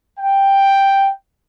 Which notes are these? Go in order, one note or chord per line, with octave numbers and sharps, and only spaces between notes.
G5